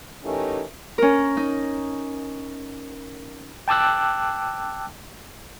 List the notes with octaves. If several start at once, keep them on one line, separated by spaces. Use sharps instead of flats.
E3 A3 C#4 D#4 G4 A#4
C#4 A#4
D#4
G5 A5 D6 E6 F#6